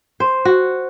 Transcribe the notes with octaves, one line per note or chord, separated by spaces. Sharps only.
C5
F#4